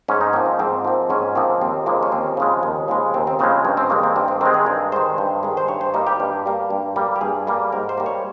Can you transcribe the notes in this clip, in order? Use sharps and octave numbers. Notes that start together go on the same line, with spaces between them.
G#2 C#4
D#4
F3 A#3 C4
A#3
G#2 C4
F3 A#3
G#2 C#4
F3 A#3 C4
D#2 C4
C#3 F3 G#3 A#3
C#4
D#2 C4
C#3 F3 G#3
D#2
C#3 F3 G#3
D#2 C4
C4
C#3 F3 G#3 C4
G2 C#4
C4
D#3 G#3 A#3
A#3
G2 C4
C4
D#3 G#3 C4
G#4
G2 A#4
D#3 G#3 C5
G2
D#3 G#3
C5
G2 C#5
C5
G3 A#3 D#4
G4
G2
G3 A#3
G2
G3 A#3
G4
G2 G#4
G3 A#3
G#2 A#4
C5
G3 A#3
C#5